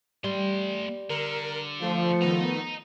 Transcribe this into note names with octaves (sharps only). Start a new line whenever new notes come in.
G3 A3 C6
D3 A#4
F3 A3 C7
D#3 A3 B3 D#5 A#5